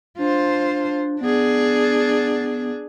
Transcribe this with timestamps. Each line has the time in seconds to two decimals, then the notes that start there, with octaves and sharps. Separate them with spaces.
0.18 D4 F4 C5
1.21 B3 D4 G#4